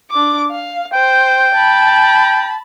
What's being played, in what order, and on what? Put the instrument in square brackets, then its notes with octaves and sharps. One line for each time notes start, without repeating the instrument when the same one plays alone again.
[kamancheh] D4 D6
F5
[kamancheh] C5 [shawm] G5
[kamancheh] A5 B5